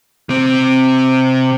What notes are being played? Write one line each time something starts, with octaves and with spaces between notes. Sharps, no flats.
C3 C4